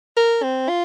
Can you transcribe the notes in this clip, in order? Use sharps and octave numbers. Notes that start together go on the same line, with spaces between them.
A#4
C4
F4